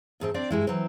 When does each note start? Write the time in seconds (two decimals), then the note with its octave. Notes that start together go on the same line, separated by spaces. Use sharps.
0.20 D2 G#2 A3 C4
0.34 C4 D4 D5
0.50 G2 G#3 E4
0.67 E3 F#3 C4